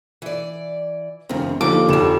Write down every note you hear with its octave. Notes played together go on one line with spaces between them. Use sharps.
E3 D5
E1 F#2 C#3 C4
D#2 D3 F3 A#3 D6
F1 D3 F3 C4 E7